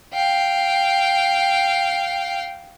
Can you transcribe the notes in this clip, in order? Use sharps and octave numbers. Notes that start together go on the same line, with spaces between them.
F5 G5